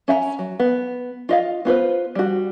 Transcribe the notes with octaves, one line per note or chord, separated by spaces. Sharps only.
C#4 E5 F#5 A#5
F#3
B3
F4 D#5 F5
B3 F4 B4 C5
G3 F#4